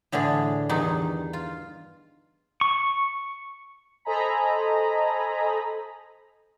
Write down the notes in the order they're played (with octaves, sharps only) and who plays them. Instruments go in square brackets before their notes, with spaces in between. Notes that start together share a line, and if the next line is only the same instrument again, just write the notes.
[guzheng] A2 D3 E3 D4 G#4
E2 G2 D#3 D#4
F4
[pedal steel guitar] C#6
[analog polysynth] A4 C5 D#5 G#5 A#5 B5